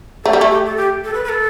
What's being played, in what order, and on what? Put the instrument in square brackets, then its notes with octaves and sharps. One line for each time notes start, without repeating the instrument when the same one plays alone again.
[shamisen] A3 [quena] A4
[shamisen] G3
A3
[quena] G4
A4
G4
A4
B4
B4
A4